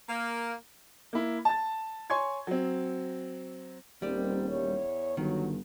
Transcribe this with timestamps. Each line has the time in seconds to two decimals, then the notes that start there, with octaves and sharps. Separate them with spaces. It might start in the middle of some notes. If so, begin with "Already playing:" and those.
0.09 A#3
1.13 A#3 E4
1.45 A5 A6
2.10 C#5 G#5 C6 C#6 G#6
2.47 F#3 C4
4.02 D#1 D#3 G3 C4 D5
4.49 E2 C#5
5.17 G1 D#3 F#3